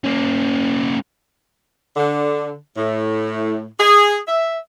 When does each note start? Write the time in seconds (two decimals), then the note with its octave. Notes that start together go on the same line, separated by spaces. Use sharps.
0.04 A#3 C#4
1.96 D3
2.77 A2
3.80 G#4
4.27 E5